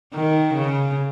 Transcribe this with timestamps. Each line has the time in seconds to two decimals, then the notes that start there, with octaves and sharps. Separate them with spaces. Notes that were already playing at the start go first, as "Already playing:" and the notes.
0.14 D#3
0.54 C#3